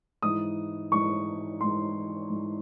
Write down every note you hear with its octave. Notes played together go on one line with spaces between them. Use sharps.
G#2 E3 D#6
G#2 E3 C#6
G#2 E3 C6
G#2 E3